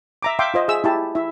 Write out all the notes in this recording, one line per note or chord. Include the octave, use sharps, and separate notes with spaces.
E5 A#5 D6
E5 F5 G5 C6 D6
F4 C5 D#5
G#4 E5 E6
E4 G4 A5
E4 E5